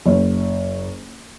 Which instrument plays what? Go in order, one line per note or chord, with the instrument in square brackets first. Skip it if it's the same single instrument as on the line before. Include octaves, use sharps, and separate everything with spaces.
[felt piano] F#1